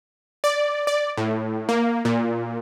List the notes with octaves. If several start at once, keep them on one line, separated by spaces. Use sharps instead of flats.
D5
D5
A2
A#3
A#2